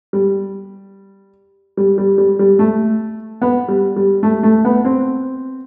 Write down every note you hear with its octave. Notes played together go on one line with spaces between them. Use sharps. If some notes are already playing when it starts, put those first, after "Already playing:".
G3
G3
G3
G3
G3
A3
B3
G3
G3
A3
A3
B3
C4